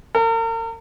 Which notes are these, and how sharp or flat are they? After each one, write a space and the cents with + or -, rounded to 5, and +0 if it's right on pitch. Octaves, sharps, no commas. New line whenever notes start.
A#4 -40